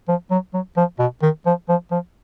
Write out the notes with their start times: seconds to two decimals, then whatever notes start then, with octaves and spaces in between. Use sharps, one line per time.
0.08 F3
0.31 F#3
0.53 F#3
0.77 F3
0.99 B2
1.22 D#3
1.46 F3
1.69 F3
1.91 F3